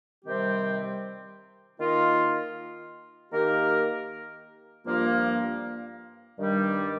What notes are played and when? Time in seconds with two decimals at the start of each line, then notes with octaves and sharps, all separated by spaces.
0.25 C3 D#3 G3 C4 G4
1.78 D#3 A#3 F4 D#5
3.31 D#3 A#3 G4 A#4
4.85 G2 F3 A#3 F4
6.38 G2 D#3 G3